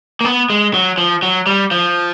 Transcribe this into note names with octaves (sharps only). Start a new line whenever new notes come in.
A#3
B3
G#3
F#3
F3
F#3
G3
F3